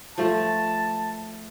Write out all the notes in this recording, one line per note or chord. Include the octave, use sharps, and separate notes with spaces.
F3 A3 A5